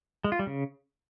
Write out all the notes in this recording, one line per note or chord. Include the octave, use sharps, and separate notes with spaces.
G#3
F4
G3
C#3